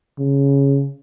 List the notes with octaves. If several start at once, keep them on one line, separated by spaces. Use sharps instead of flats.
C#3